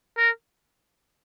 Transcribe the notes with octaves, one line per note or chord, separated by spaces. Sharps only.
A#4